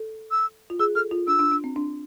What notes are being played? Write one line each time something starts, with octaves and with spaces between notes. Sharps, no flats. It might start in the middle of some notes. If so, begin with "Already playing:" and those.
Already playing: A4
E6
F4
G#4 E6
A4 F6
F4
D4 E6
D4
D4
C4
D4